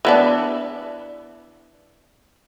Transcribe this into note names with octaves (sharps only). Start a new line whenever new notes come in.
E3 B3 D4